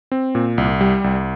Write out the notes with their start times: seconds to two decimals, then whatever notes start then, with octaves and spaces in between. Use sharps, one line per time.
0.12 C4
0.35 A#2
0.58 C2
0.81 G3
1.04 C2